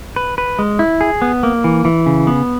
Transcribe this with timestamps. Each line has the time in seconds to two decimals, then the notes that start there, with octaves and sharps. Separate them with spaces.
0.16 B4
0.38 B4
0.59 G#3
0.79 E4
1.01 G#4
1.22 B3
1.43 A#3
1.64 E3
1.85 E3
2.06 C#3
2.27 B3